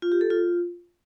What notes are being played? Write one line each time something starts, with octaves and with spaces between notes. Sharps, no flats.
F4
G4
A4
F4